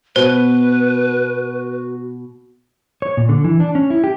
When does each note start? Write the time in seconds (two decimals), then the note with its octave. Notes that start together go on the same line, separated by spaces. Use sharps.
0.16 B2 F#4 B4 C5
3.02 C#5
3.17 A#2
3.29 D3
3.45 E3
3.60 D4
3.75 C#4
3.90 E4
4.04 G4